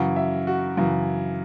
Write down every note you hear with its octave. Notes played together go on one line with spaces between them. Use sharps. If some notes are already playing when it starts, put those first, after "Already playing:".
Already playing: F#2 C#3 E3 F#5
E5
F#4
F#2 C#3 E3